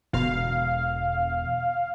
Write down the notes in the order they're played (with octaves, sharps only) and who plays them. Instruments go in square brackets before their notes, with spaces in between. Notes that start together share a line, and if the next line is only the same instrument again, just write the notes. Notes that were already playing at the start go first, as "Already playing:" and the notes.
[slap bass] E1 D3 [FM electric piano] B2 [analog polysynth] F5